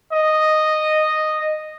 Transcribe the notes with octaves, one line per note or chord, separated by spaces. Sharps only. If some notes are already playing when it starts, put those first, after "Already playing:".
D#5